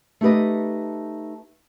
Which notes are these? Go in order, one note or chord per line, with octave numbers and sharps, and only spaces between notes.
A3 D#4 G4 B4 D#5